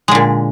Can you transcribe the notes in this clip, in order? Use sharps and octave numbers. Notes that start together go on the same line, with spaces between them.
A#2 D3 G#3